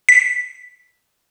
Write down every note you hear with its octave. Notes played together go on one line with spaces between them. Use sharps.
B6